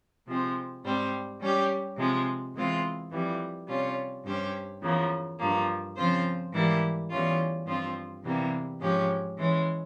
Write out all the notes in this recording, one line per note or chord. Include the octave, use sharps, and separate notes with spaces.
C3 F3 G#3 C4
G#2 G3 C4
G3 C#4 G4
C3 F3 G#3
E2 E3 G#3 C4 F4
F2 E3 G3
C3 G3 C#4 F4
G2 G3 C#4 G4 C5
E2 C#3 F3 A#3
G2 F3 A#3
C#3 F3 C4 F4 C5
G#2 E3 G3 A#3 E4
E2 E3 G3 C#4 F4
G2 F3 C4 F4
E2 C3 E3 G3 A#3
G#2 F3 G#3 C#4 G4
E3 G#3 C#4